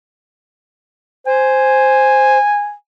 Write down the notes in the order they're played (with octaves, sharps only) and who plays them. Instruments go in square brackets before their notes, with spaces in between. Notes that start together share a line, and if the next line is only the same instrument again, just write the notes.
[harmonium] C5 [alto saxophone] G#5